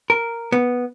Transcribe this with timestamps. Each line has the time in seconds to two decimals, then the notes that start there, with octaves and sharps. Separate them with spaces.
0.10 A#4
0.52 B3